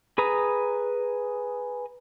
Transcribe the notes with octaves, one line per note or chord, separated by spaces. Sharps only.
G#4 B4 A#5 D#6